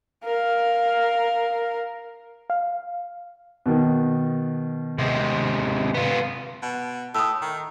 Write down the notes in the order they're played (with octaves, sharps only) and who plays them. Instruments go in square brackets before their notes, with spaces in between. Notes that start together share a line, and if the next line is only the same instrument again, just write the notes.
[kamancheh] A#4 F5
[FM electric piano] F5
[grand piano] B2 D#3
[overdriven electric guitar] C3 G#3
B3 F4
[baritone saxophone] B2
[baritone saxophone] A2 [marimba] D#6 E6
[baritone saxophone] D#3